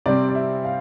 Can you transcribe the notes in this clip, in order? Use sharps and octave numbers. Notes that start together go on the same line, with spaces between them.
C3 G3 C4 D5
D5
E5
F5